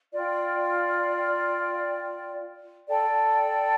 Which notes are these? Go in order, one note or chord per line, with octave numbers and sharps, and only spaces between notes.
F4 D5 G5
A4 D5 G5